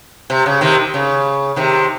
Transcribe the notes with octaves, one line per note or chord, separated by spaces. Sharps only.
C3
C#3
C3 D#3
C#3
C3 D#3